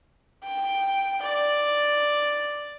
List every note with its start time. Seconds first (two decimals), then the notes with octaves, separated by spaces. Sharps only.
0.44 G5
1.22 D5